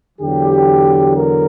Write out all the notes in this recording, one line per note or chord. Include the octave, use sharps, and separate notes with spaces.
E2 D3 F#3 G4
A#4